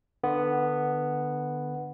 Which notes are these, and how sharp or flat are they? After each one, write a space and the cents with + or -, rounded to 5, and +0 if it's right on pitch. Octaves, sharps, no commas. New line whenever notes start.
D3 +25 B3 +0